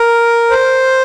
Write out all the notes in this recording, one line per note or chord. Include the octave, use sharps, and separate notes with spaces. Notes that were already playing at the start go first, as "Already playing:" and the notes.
Already playing: A#4
C5